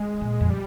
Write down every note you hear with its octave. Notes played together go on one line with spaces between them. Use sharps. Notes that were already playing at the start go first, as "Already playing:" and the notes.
Already playing: G#3
A#2
F2
G3